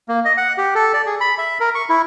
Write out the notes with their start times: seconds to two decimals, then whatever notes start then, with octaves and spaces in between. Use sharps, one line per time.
0.09 A#3
0.25 D#5
0.37 F#5
0.58 G4
0.75 A4
0.94 D5
1.06 G#4
1.21 B5
1.38 E5
1.60 A#4
1.75 C#6
1.90 E4